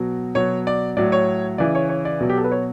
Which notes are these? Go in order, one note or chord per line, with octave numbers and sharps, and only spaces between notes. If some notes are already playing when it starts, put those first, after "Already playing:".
Already playing: B2 F#3
B2 F#3 C#5
D5
A2 F#3 D5
C#5
C#3 E3 D5
C#5
C#5
D5
B2 F#3
G4
A4
B4
C#5